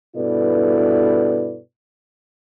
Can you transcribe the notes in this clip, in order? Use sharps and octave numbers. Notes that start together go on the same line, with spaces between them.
G2 B2 E4 A4 B4 D5